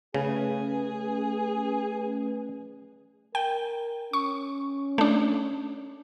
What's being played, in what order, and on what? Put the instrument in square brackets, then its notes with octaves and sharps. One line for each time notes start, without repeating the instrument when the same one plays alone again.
[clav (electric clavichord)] C#3 [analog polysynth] A3 C#4 B4 [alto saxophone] G#4
[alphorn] A#4 [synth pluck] G5
[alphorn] C#4 [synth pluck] C#6
[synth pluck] A3 D4